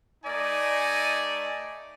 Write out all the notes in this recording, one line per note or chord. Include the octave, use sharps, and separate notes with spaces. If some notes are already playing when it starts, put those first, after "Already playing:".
A3 D#4 D5 D#5 G#5